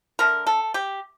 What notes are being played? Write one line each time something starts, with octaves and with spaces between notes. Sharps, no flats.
D3 A3 A#4
A4
G4